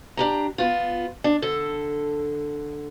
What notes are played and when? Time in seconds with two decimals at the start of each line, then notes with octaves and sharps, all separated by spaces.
0.17 D4 G4 A#5
0.58 B3 F4
1.24 D4
1.42 D3 A4